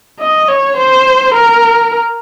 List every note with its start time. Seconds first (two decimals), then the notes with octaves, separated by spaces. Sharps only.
0.20 D#5
0.48 C#5
0.77 C5
1.34 A#4